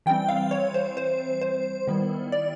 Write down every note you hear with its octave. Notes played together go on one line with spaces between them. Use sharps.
E3 G3 C4 G5
F5
C#5
C5
C5
C5
D#3 G3 B3 E4
D5